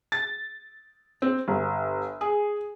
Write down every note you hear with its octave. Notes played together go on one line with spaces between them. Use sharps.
A6
C4
G1
G#4